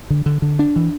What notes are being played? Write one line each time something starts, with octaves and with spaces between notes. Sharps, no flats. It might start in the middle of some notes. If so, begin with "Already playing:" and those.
D3
D3
D3
D4
E3